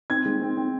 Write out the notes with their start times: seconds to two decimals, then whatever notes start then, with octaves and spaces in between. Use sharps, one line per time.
0.10 C4 G#6
0.26 G#3
0.42 C4
0.57 C4